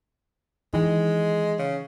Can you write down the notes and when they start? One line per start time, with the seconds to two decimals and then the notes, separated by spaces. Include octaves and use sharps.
0.74 D#3 E3 G#3
1.59 C#3